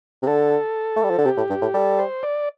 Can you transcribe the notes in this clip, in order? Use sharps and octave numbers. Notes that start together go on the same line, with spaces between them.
C3
D3 A4
A3
G3
F3
D3
C3 G4
A2
G2
A2
G3 A4
C5
D5